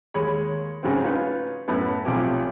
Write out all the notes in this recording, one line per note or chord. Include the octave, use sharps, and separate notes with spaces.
D#2 G#3 C#5 B5
G#2 C#3 F#3 C4
C#4 D#4 F4 B4 C#5
F#2 A2 A3 B3
B1 C3 F3 A3 G4 G#5